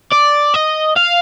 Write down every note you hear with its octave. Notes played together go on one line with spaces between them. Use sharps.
D5
D#5
F5